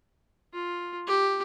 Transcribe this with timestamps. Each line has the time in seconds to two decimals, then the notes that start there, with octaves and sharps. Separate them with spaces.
0.53 F4
1.07 G4